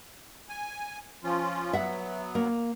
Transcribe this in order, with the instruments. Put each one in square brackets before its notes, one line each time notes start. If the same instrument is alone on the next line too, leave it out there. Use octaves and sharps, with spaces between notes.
[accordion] G#5
F3 C#4 F4
[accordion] F#3 B3 [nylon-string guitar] E5 F#5
[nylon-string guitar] A#3